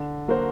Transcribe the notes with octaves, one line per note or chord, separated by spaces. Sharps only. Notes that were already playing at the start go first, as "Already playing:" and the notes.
Already playing: D3
F#3 A#3 F#4 C5